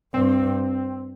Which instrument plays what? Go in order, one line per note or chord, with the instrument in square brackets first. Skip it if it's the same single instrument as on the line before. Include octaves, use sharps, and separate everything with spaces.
[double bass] G2 [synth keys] C4